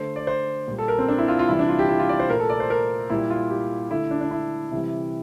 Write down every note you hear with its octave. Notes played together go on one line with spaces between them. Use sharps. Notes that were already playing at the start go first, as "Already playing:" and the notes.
Already playing: D3 A3 C5
D5
C5
A#2 G3
A4
A#4
C4
D4
E4
F4
F4
C3 E3 G3 E4
D4
F4
G4
E4
F4
D5
C5
A#2 A3 A#4
A4
D5
C5
A#4
A#2 G3 E4
F4
G4
D3 A3 E4
D4
D4
E4
C3 E3 G3